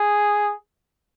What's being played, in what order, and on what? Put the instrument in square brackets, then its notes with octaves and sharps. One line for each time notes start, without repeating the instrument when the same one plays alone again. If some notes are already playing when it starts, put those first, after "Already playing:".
Already playing: [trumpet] G#4